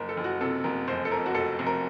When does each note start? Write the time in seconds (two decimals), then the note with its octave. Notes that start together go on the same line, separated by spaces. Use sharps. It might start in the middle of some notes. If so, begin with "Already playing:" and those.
Already playing: F#1 A#4
0.09 A4
0.17 F#1
0.24 F#4
0.41 C3 A4
0.64 F#1 A#4
0.87 F1 C5
1.05 A4
1.11 F2 A#4
1.26 F#4
1.34 F1 A4
1.59 F1
1.66 A#4